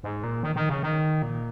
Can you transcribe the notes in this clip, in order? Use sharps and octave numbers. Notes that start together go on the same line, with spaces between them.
G#2
A#2
D#3
D#3
C#3
D#3
A#2